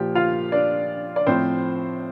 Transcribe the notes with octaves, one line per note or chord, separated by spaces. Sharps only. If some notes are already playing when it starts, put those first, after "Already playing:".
Already playing: A#2 F3 G4 G5
F4 F5
D4 D5
D5
A2 F3 C4 C5